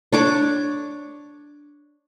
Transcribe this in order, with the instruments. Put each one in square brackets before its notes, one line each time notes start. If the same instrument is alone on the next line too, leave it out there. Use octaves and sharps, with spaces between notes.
[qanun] D4 C#5 D6